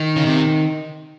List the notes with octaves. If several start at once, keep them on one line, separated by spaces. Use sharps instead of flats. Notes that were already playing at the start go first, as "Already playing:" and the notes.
Already playing: D#3
C#3
C3